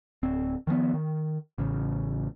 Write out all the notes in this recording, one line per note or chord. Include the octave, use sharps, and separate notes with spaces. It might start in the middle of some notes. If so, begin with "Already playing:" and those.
D1 C4
D#3 F3 G#3 B3
D#3
A1 C#3